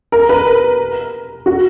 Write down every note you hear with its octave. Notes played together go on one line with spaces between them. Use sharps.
A#4
B4
A#4
F#4